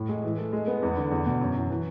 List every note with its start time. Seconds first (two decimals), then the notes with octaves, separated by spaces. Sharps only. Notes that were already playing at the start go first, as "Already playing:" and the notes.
Already playing: A2
0.09 G#3
0.24 E3
0.38 A3
0.53 G#3
0.67 B3
0.83 E2
0.97 D3
1.11 E2
1.26 B2
1.41 F#2
1.56 E3
1.70 E3